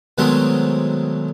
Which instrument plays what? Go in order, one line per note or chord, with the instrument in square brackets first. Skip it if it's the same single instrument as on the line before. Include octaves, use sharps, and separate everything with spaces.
[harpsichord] B2 D#3 F#3 G#3 A3 C4